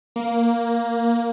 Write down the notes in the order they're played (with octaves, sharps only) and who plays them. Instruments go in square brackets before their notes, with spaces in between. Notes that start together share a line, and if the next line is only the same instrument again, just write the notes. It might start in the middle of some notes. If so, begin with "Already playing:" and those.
[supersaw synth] A#3